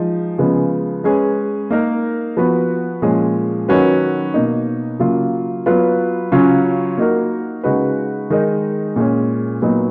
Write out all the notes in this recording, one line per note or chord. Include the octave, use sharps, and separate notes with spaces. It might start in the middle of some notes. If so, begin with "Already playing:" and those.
Already playing: F3 G#3 D#4
C#3 F3 G#3 B3
G#3 C#4 G#4 B4
A#3 D#4 A#4
F3 B3 F#4 B4
A#2 F3 G#3 C#4 G#4
D#3 F#3 C#4 F#4 B4
B2 A#3 D#4
C#3 F#3 A#3 F4
F#3 B3 F4 B4
C#3 F#3 C#4 F4
A#3 D#4 F#4 A#4
C#3 G#3 D#4 F#4 B4
D#3 G#3 D#4
A#2 G#3 C#4
A#2 F#3 B3 D#4